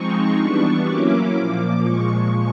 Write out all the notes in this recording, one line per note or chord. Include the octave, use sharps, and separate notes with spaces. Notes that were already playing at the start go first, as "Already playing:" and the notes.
Already playing: F3 G#3 C4 D#4 C#6
E3 G3 B3 D4
F#3 A#3 C#4 E4 D6
A#2 F3 A#3
A#2 F3 G#3 C#6